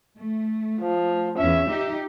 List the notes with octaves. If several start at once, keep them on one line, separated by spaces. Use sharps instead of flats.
A3
F3
E2 C#4 E5
D#4 G4